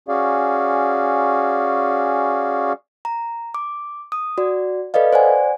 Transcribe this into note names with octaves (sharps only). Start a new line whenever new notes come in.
C#4 F#4 G#4 D5 F5
A#5
D6
D#6
F#4 D5
A4 B4 D5 D#5 F5
C5 D5 F#5 G#5